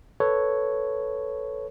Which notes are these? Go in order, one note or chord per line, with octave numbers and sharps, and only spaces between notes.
A4 B4 C#5